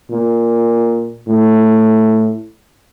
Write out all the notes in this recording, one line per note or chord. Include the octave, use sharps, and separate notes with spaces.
A#2
A2